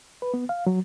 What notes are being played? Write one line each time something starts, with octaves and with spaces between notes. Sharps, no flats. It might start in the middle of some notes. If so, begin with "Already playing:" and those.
B4
B3
F5
F#3